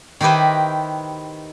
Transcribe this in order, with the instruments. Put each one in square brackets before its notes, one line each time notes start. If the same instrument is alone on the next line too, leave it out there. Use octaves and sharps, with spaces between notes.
[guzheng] D#3 D#4 E4 G4 B4 C5